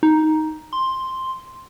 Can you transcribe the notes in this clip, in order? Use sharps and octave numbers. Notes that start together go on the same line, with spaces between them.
D#4
C6